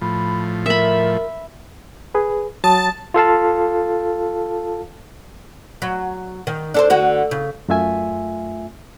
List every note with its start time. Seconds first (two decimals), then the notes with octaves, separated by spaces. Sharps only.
0.01 A2 F3 B5
0.66 A#4 E5 B5
2.15 G#4 B4
2.64 F#3 A5 D#6
3.14 F4 A4 F5 A5
5.82 F#3
6.47 D#3
6.74 D4 A4 C5
6.90 D3 F#4
7.31 C#3
7.68 F#2 A3 F4 E5 G#5